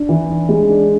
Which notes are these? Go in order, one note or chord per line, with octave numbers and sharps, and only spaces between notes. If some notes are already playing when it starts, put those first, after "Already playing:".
Already playing: D4
E3
D4
G#3
D4